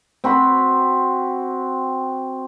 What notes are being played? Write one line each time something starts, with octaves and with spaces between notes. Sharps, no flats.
C4 F#4 B5